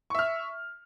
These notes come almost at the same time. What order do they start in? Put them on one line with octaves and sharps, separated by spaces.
C#6 E5 F6